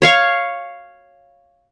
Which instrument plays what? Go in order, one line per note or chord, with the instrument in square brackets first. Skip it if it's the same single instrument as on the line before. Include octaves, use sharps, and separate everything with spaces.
[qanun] C#5 F5 C#6